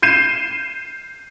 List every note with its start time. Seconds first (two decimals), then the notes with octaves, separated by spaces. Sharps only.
0.02 G6 C7 D#7 E7